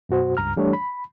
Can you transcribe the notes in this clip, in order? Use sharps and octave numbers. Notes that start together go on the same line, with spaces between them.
F#2 B2 F#4 C5
C#2 G2 A#5 F6
E3 G3 A3 D4 C#5
B5